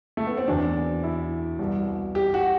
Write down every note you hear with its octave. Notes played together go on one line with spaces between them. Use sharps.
A3
B3
C4
E2 B2 D4
E4
C2 B2
G4
F#4